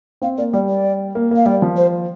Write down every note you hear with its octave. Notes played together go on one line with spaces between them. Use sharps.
C4 F5
A#3 D5
G3 D5
D5
A#3
A#3
F5
G3 D5
F3
C5